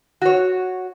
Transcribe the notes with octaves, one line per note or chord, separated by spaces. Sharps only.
F#4 C#5